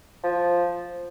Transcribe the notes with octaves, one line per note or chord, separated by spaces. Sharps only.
F3